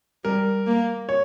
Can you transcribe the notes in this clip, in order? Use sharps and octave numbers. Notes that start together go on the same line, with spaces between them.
G3 A#4
A#3
C#5